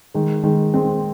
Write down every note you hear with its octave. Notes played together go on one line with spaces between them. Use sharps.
D#3 G#3
D#3 G#3
G#3 C4